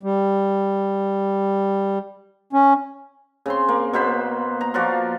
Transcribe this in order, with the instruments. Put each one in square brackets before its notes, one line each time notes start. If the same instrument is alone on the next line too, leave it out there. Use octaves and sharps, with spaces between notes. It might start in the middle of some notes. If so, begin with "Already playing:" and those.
[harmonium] G3
C#4
[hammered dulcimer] C#3 C4 C6
A#3
B2 A#3 C5 B5
A#5
F3 F4 F#4 D5